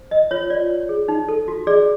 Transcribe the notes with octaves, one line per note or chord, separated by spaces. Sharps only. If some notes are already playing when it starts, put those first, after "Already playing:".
Already playing: C5
A#4 D#5
F4 C#5
F4 D5
C#5
G#4
D#4
A4
F#4
G#4 D5